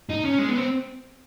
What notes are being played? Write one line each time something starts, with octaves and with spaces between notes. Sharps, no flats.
D#4
C#4
G#3
B3
C4